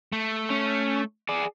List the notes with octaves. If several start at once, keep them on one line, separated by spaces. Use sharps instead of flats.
A3
C#4
G#4 D5